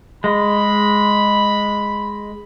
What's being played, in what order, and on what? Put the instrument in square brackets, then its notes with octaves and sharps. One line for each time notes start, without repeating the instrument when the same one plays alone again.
[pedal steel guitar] G#3 [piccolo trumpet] B5